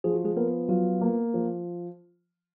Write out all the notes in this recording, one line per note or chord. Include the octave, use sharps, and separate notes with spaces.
F3 G#4
F#4
G#3 G#4
A#3 B3 A#4
F#3 F4 F#4
A#3
F3